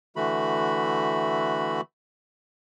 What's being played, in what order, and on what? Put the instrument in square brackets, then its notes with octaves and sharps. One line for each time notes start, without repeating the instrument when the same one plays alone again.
[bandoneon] D3 E3 A3 F#4 B5